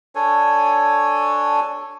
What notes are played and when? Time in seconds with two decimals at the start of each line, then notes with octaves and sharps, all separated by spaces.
0.15 D4 A4 C#5 G#5